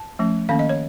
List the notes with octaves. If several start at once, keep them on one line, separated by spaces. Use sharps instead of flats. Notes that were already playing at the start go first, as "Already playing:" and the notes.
Already playing: A5
F3 A3 C#4
D#3 A#3 C#4 F5
D#5
C#5